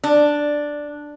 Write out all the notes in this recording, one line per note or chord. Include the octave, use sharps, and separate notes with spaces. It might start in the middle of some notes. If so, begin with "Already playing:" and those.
D4